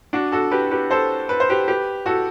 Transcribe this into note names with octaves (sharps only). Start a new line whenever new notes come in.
D4 F#4
F#4 A4
G4 B4
G4 B4
A4 C5
B4
C5
G4 B4
G4 B4
F#4 A4